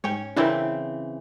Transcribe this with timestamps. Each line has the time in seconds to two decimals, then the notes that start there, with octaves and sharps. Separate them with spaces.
0.04 G#2 C#4 C#5 G5
0.37 C#3 E3 C4 D4 E4 A#4